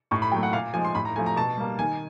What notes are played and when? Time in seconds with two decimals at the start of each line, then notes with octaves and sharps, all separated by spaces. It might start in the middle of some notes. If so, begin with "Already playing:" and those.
0.11 A2 C#6
0.22 B5
0.32 F#3 A3 G5
0.43 F#5
0.53 A#2 F5
0.74 F3 G#5
0.77 G#3
0.85 C6
0.95 A2 B5
1.05 A#5
1.16 F3 A3 G#5
1.26 A#5
1.36 B2 A5
1.57 G3 A#3
1.79 D#3 G#5